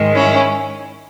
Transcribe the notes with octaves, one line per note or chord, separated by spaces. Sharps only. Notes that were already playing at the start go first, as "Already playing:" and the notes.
Already playing: G#2 D#3 G#3
C#4 E4